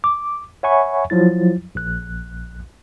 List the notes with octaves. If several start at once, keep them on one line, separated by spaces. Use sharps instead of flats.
D6
C#5 E5 F#5 G#5 B5 C#6
F3 F#3 E4 A6
A#1 F#6